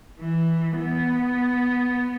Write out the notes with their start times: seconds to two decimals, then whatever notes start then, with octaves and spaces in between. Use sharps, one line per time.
0.19 E3
0.78 B3